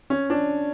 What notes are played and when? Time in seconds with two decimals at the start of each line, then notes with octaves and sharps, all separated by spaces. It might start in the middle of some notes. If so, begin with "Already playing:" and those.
0.10 C#4
0.30 D4